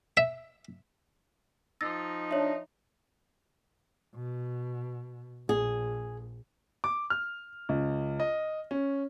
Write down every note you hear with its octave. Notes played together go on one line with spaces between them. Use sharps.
E5
F3 D#4 E6 A6 A#6
D4 C#5 E5
B2
A#1 G#4
D6
F6
C#2
D#5
C#4